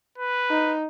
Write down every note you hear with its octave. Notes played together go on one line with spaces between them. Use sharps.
B4
D#4